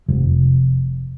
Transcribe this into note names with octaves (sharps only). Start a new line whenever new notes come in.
F1